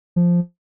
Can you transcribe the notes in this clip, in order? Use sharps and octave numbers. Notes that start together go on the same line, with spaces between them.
F3